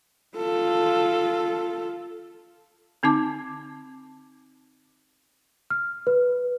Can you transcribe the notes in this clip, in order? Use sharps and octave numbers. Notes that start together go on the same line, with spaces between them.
F4 A4
D3 C4 D#4 A5 D6
F6
B4